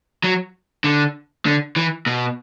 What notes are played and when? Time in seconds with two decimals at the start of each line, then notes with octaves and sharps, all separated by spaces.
0.24 F#3
0.84 D3
1.46 D3
1.76 E3
2.06 B2